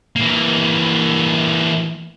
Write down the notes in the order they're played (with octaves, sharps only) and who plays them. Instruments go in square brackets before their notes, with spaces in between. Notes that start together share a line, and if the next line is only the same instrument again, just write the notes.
[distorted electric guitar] E3 A#3